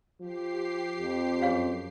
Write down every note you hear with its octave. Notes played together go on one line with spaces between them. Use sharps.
F3 G4 C7
F2
F#2 G#4 C#5 F5